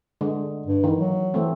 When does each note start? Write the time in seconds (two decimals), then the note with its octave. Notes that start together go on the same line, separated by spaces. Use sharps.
0.21 D3 G#3
0.66 G2
0.84 D#3 E3
0.98 F#3
1.34 E3 A3 C4